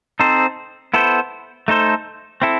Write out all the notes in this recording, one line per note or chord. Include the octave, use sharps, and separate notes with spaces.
C4 D#4 A4 C5
B3 E4 A4 C5
A3 D#4 A4 C5
C4 E4 A4